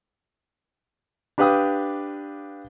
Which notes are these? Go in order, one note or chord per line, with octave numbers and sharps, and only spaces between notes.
D4 G4 B4 F5 G5 D#6